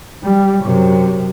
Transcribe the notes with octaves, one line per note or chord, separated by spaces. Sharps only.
G3
F#2 C3